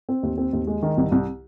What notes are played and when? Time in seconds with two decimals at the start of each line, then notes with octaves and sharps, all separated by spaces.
0.09 C4
0.23 D#2
0.38 C4
0.53 D#2
0.67 G#3
0.82 D#3
0.97 C2
1.12 C2